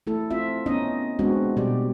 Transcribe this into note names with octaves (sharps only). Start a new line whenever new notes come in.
A3 E4 A4
C4 F4 E5
B3 C#4 D#4 D#5
G#3 B3 C4 D4 F#4
B2 G3 G4 D5